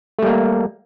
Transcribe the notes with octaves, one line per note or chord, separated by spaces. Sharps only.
G3 A3 A#3